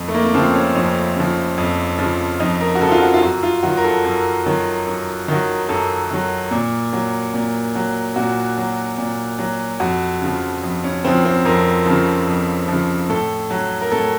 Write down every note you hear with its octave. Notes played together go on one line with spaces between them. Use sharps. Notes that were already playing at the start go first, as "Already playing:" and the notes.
Already playing: F2
A3
A#3
A#3
C#3 F3 C4
C#4
F2 C#4
C#3 F3
F2
C#3 F3
F2 D#4
A#4
F#4
C#3 F3 A4
F4
F#4
F4
F#2 F#4
F4
D#3 F#3 F#4
A#4
A4
F#2
D#3 F#3
F#2
D#3 F#3
F#2 A4
D#3 F#3
A#2
F#3
A#2
F#3
A#2 F#4
F#3
A#2
F#3
F2 F#4
C#3 F3
F2
C#4
C#3 F3 C4
C4
F2 A#4
C#3 F3
F2
C#3 F3
A2 A4
F#3
A#4
A2 A4